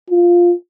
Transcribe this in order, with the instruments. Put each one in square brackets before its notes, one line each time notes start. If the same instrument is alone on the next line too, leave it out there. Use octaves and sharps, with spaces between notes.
[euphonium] F4